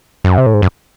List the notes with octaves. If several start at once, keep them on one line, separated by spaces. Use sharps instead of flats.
F#2
C3
A2
G#2
F#2